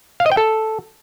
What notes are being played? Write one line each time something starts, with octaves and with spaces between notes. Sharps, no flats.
F5
D#5
G5
A4